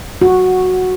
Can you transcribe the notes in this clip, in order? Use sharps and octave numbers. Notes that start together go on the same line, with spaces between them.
F#4